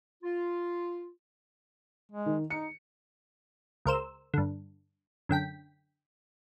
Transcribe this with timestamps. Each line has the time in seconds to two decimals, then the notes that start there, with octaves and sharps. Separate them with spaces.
0.23 F4
2.12 G#3
2.26 D#3
2.50 D#4 C#7
3.86 C#2 A#4 C5 E6
4.34 G2 D3
5.29 F#2 D3 G5 B6